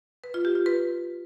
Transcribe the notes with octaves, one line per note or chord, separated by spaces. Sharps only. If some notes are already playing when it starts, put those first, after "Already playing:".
B4
F4
G4
F4
B4